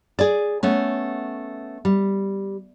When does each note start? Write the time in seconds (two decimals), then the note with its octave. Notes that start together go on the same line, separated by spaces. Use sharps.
0.19 G#4 D5
0.63 A3 B3 C#4
1.85 G3